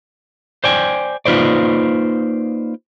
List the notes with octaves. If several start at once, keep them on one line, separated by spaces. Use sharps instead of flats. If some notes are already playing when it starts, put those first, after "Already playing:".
C5 D5 G5 G#5
A#3 D#4 F4 B4 C5 D5